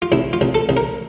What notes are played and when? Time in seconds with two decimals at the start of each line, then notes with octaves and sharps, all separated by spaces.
0.02 F4
0.12 C2 E4
0.33 F4
0.41 C2
0.54 A4
0.69 C2
0.77 A#4